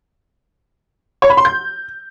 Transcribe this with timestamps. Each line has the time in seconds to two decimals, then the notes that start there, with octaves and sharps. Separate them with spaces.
1.22 C#5
1.30 B5
1.37 C6
1.45 G6